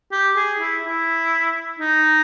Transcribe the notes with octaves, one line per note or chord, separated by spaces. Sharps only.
G4
G#4
E4
E4
D#4